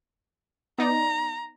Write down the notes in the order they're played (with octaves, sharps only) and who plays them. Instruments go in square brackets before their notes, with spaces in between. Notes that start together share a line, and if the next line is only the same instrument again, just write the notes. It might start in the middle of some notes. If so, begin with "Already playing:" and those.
[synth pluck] B3 D#4 D5 [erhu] A#5